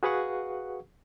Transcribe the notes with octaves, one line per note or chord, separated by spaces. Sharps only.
F#4 G#4 B4 F5 F#5 C#6